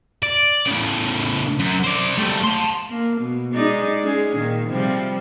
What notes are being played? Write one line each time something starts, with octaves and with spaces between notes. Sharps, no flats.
D5
A2 C#3
F#2
C5 D5
G3 A3
A5 C6
A#3
B2
G#3 D#4 D5
G#3 C#4 G#4
A#2 D#3
C3 F3 G3